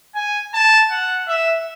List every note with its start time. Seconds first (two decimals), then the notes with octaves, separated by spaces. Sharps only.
0.15 G#5
0.54 A5
0.91 F#5
1.28 E5